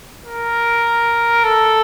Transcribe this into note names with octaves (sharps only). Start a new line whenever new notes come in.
A#4
A4